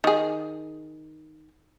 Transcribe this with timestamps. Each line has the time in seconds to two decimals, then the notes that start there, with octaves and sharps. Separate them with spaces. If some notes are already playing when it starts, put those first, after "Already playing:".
0.04 D#3 G#4